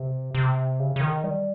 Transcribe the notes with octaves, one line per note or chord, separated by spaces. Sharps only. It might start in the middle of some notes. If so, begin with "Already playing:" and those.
Already playing: C3
C3
C#3
C#3
D#3
G3